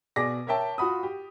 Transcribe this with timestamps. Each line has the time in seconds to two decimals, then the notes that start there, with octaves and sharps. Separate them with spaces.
0.16 B2 G#4 D5 D6 A#6
0.47 A#4 C#5 E5 G5 A5
0.78 F4 F#4 B5 D#6
1.03 G4